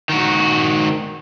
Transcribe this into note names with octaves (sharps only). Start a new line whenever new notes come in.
D#3 F#4